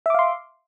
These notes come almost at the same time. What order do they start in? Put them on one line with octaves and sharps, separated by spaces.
E5 D6 F5 C6